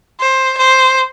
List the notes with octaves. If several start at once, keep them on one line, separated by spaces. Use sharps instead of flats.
C5
C5